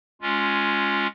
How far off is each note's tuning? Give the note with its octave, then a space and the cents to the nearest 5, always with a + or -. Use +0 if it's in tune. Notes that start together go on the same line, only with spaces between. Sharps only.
G#3 +0 C#4 +0 F4 +0